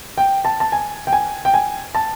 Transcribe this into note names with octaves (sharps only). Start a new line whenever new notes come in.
G5
A5
A5
G#5
G5
G#5
G5
G#5
A5